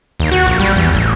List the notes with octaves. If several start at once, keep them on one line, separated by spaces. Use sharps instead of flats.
D#2
F#4
A#1
G3
E2
A1